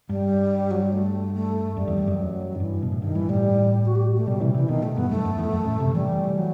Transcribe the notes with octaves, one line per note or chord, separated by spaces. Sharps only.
G2 G3
F#3
G3
A3
A3
F#2 G3
E2
E2
F#2
F#3
D#3
G2 E3
B2
A2
G2 D#3
G2 E3
A2 G3
F#4
G4
A3
B2 G3
C3 E3
C3 E3
B2 D#3
A3
G2 B3
F#2 A3
F#2
E2
F#2
A2
C3
E3 G3
F#3